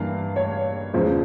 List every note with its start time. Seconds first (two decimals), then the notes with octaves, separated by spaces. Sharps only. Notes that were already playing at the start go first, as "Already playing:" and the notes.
Already playing: G2 E3 A#3 F5
0.36 C#5
0.93 E2 C#3 F3 G#3 C5